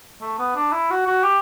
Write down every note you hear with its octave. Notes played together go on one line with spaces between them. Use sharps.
A3
B3
D4
E4
F#4
F#4
G4